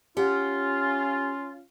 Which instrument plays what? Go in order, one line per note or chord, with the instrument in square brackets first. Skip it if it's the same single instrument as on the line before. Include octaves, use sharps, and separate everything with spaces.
[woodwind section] C#4 F4 [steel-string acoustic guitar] G4 F#5